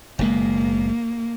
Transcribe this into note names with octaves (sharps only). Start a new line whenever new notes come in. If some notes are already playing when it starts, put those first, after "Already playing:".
F#1 B2 G#3 A#3